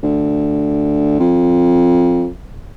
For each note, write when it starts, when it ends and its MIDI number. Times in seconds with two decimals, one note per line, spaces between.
0.03 1.18 38
1.20 2.27 41